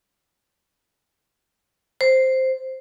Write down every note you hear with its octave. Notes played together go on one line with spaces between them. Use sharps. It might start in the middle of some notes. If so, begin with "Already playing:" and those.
C5